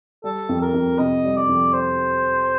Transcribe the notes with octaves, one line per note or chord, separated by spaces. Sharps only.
G3 A4
F2
A#4
F2
C3 D#5
G3
D5
F2
C5